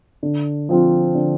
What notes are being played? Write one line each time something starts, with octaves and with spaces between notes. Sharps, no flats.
D3
F3 C4 F4
D3